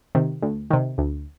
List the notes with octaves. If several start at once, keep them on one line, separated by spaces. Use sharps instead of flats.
C3 D#3
D2
C3 D#3
D2